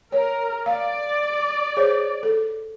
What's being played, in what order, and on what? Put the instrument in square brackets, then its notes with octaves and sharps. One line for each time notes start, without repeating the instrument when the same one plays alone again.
[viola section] A#4 [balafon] C#5
[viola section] D5 [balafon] F5
[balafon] G#4 C5 C#5
A4